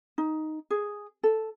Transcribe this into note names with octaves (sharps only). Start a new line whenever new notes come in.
D#4
G#4
A4